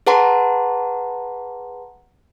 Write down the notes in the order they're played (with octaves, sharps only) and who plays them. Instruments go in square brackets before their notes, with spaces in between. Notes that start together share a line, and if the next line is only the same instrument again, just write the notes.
[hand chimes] G#4 B4 F#5 A5 A#5 C6